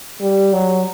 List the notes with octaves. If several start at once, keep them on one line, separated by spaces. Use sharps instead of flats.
G3
F#3